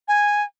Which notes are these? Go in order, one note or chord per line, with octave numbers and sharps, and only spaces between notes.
G#5